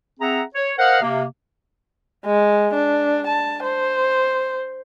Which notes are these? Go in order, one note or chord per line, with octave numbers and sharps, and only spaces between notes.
C4 G#4 E5 F#5 A#5
C#5
A#4 C5 D#5 F5 F#5
C3 A#3
G#3
D4
A5
C5